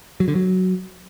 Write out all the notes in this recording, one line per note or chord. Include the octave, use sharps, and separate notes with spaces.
F#3
D3
F#3